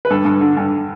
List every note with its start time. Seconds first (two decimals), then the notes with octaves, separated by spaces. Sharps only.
0.05 B4
0.10 G2 A4
0.25 G2
0.41 D3
0.57 G2